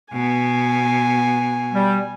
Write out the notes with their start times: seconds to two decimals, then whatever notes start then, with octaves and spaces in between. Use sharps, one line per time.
0.13 B2 B3 G#5
1.73 G3